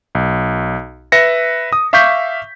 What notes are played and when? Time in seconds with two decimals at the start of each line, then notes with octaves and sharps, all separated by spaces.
0.15 B1
1.12 B4 E5 A#6 C#7
1.73 D#6
1.93 E5 F5 C#6 D6 G6 B6